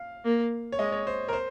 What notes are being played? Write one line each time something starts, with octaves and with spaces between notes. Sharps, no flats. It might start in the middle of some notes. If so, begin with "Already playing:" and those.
Already playing: F5
A#3
C#5
G#3 D#5
C#5
C5
A#4
C5